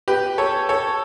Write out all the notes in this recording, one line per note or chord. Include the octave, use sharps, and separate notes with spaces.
G4 B4
A4 C#5
A4 C#5